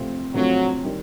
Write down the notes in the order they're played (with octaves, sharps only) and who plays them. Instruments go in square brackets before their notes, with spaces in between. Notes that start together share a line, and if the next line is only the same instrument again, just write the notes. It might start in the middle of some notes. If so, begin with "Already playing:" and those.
Already playing: [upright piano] C3 F3 A3 C4 F4
[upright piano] C3 F3 A3 C4 F4 [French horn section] F#3
[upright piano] D#3 G3